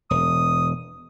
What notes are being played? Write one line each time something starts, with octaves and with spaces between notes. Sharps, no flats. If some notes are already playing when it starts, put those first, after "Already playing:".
E1 D#6